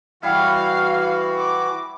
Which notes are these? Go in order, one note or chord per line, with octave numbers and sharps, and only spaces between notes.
E3 G3 E4 F#4 F5
D6